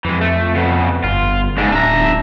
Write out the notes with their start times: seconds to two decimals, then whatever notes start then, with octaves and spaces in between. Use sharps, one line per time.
0.05 F2 E3 G#3
0.21 A3
0.55 C#3 B3
1.04 G1 F4
1.58 G#2 C#3 D4
1.72 D1 D4 E5 A#5